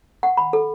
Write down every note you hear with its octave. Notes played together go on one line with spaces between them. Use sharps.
F#5
B5
A4